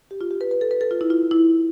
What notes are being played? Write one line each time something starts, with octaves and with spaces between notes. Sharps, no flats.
G4
F4
G4
B4
B4
A4
B4
A4
F4
E4
F4
E4